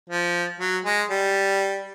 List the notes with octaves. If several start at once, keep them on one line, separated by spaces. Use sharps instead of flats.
F3
F#3
G#3
G3